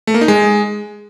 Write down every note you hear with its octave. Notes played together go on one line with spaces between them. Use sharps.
A3
A#3
D#4
G#3